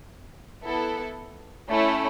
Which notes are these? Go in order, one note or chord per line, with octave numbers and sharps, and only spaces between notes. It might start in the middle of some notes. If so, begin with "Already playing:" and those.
B3 E4 A4
A3 C#4 E4